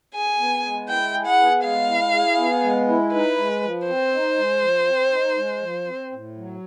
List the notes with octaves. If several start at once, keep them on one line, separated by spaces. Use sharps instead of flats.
G#4 G#5
B3
G#3
E4 G5
G#4
F#5
B3
G#3 F5
E4
G#4
B3
G#3
E4
D#4 B4
G#3
F3
C4 C5
D#4
G#3
F3
C4
D#4
G#3
F3
C4
A2
F#3